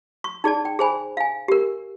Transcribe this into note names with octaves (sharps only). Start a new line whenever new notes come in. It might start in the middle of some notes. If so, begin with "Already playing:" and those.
C#6
D#4 G#4 D5 A5
G5
G#4 C5 G#5 B5
F5 G#5
G4 A#4